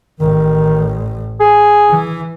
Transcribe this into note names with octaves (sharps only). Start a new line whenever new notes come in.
A1 D#3
G#4
E3